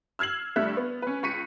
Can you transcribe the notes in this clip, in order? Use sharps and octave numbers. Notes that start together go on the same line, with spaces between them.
E6 F6 G#6 C7 F#7
G2 G3 A3 E5 F#6
B3
C#4 B4
C#2 C#6 B6 C#7 D#7